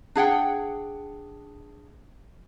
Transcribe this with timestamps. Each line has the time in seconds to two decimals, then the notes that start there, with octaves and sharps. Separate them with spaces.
0.16 D4 G#4 F#5 G5